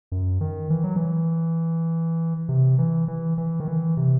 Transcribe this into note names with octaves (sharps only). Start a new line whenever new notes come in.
F#2
D#3
E3
F#3
E3
C3
E3
E3
E3
D#3
E3
C3